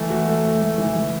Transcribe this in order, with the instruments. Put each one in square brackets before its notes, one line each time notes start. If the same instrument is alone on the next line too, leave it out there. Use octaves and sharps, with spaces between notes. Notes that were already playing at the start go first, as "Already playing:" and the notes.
Already playing: [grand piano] E3 A3
F#4
A3
A3
A3
E3
E3